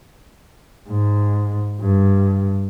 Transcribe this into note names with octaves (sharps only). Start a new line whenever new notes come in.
G#2
G2